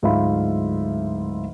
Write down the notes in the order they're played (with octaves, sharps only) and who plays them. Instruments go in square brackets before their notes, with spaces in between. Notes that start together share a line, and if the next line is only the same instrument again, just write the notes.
[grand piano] D1 G#2 F4 E5 F5 B5